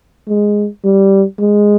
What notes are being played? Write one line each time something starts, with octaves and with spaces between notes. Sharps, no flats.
G#3
G3
G#3